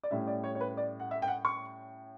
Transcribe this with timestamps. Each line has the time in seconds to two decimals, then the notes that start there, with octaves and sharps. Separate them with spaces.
0.03 D5
0.11 A2 G3 C#4 E5
0.27 D5
0.44 C#5
0.55 C#5
0.60 B4
0.77 D5
1.00 F#5
1.11 E5
1.22 G5
1.28 F#5
1.45 C#6